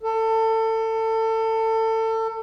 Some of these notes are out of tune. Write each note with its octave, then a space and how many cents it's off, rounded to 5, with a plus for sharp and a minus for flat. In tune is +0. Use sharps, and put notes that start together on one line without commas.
A4 +25